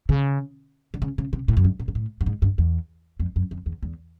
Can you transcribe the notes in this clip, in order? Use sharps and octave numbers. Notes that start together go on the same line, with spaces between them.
C#3
D3
C#3
C#3
C3
A2
F#2
G2
A#2
G#2
A2
G2
G#2
G2
E2
F2
F#2
F2
E2
E2